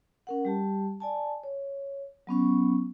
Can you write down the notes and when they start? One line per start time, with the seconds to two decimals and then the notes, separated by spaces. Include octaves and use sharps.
0.27 C#4 A#4 F#5
0.45 G3 G4 A5
1.00 D5 G#5 A5
1.44 C#5
2.27 F#3 B3 C#4 C#6